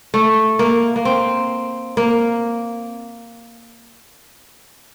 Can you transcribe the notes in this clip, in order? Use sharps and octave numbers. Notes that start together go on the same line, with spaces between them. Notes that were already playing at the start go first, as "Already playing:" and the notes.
A3
A#3
A#3
C4
A#3